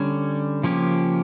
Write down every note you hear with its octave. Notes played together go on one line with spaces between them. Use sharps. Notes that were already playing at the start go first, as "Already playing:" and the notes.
Already playing: D3 G3 C#4
C#3 F3 A#3 C#4 G4